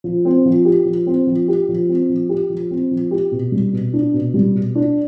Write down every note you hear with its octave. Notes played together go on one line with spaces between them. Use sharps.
F3
C4
F3
G4
F3
C4
F3
G4
F3
C4
F3
G4
F3
C4
F3
G4
B2
G3
B2
D4
B2
G3
B2
D4